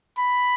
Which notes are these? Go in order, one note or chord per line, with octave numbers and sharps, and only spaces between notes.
B5